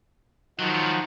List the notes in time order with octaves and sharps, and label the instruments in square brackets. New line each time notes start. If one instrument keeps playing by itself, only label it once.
[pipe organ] D#3 F3 F#4 [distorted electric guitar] F#3 F4